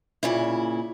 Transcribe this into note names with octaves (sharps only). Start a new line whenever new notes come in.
A#2 C#3 E4